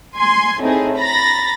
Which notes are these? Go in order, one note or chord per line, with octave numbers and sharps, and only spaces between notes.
G#5 C6 G#6
A2 C4 D#4 G#4
A#5 B5 A6 A#6